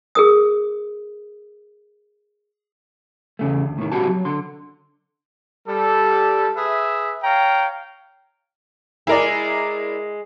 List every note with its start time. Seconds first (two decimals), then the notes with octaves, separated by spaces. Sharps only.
0.15 G#4 A#4 D#6
3.39 E2 C#3 A3
3.66 D2
3.78 A2 D#3
3.92 B1 A2 G3 C4 F#4 A5
4.07 F#3
4.25 D3 C6
5.67 G3 A4
6.56 G#4 B4 E5
7.23 C#5 F5 G5 A#5
9.07 G#3 E4 A#4 D5